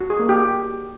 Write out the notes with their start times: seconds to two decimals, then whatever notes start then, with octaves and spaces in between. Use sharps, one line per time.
0.01 F#4
0.10 G#4
0.20 A#3
0.29 G4
0.39 F#4